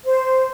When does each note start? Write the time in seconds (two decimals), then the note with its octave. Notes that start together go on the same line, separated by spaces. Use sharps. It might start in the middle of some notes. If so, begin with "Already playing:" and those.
0.05 C5